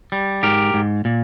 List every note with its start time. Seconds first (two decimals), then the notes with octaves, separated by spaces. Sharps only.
0.12 G3
0.43 G#2 G4 A#4
0.74 G#2
1.05 A#2